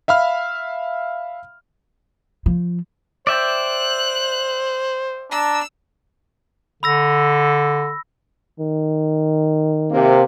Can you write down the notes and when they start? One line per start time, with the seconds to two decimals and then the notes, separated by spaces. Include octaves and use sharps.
0.08 E5 F5 B5 F6
2.46 F3
3.27 C5 D5 E5 G5 F#6
5.31 D4 A5 A#5 E6
6.83 D3 B5 E6 A#6
8.60 D#3
9.92 C3 A#3